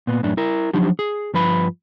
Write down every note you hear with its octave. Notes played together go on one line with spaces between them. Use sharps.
A#2 B3
F#2 A2 D4
E4 A#4
F3 F#3 D4 D#4 G4
G#4
G2 F3 B4 B5